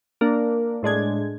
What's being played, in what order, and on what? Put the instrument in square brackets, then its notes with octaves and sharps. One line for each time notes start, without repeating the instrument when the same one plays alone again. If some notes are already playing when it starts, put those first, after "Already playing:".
[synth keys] A#3 D4
A2 G#3 D4 G#6